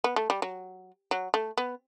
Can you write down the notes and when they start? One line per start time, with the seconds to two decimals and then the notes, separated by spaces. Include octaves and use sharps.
0.04 B3
0.16 A3
0.30 G3
0.42 F#3
1.11 F#3
1.34 A3
1.58 B3